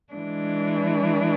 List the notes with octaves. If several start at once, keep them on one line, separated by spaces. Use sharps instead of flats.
E3 G#3 D4